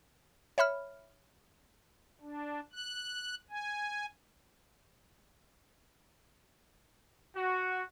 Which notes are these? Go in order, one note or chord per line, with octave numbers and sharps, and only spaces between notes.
C#5 E5 B5 F6
D4
F#6
G#5
F#4